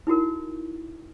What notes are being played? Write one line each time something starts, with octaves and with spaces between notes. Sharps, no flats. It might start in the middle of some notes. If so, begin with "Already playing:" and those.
D#4 E4 F#4 A#4